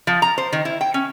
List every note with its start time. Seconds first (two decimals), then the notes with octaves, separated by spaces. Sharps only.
0.07 F3
0.22 A#5
0.38 C5
0.53 D#3
0.65 E4
0.81 G5
0.94 C#4